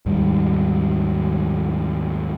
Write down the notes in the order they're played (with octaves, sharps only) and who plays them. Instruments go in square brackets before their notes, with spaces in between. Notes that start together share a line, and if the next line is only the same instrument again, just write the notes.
[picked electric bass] D#2 G#2 G3